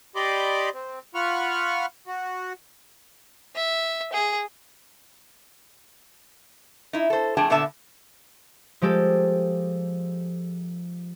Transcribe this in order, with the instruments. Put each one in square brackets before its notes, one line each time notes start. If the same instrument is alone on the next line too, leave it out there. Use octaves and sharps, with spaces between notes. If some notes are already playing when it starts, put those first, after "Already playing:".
[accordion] G4 D5 D#5 B5 C6 D6
C4
F4 F#5 B5 C#6 F6
F#4
[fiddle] E5
G#4
[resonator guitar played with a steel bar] D#4 E4
A4 C5
F2 A3 D4 G#4 G5 A5
A#2 D3 B3 E5 A5
[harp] F3 G#3 G4 A4